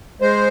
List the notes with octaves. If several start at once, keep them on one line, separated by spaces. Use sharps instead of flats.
G#3 C5